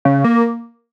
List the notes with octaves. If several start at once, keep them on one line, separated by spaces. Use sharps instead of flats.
C#3
A#3